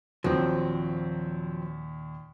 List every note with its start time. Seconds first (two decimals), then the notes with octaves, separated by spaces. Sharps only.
0.24 D#2 A#2 F3 F#3 C4